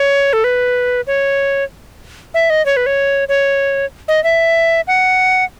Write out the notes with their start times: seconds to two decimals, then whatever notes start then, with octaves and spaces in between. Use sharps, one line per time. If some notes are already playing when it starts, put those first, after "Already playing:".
Already playing: C#5
0.33 A4
0.44 B4
1.07 C#5
2.34 E5
2.50 D#5
2.66 C#5
2.77 B4
2.86 C#5
3.29 C#5
4.08 D#5
4.24 E5
4.87 F#5